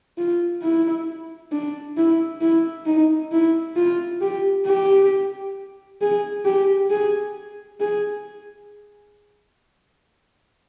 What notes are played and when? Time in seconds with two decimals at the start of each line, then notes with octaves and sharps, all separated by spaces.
0.18 F4
0.62 E4
1.52 D4
1.97 E4
2.41 E4
2.86 D#4
3.32 E4
3.76 F4
4.21 G4
4.66 G4
6.01 G#4
6.45 G4
6.91 G#4
7.80 G#4